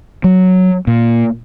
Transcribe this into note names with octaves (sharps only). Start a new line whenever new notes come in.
F#3
A#2